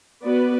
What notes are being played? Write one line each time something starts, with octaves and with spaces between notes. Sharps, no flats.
B3 F#4 B4 D5